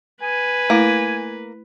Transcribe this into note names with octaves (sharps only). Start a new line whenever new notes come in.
B4 G#5
A3 A#3 E4